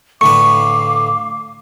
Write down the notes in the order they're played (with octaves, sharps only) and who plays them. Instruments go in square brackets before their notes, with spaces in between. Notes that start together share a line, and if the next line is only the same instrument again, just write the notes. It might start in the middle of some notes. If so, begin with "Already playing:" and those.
[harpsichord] A2 D3 B4 [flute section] F5 D6 [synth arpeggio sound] C#6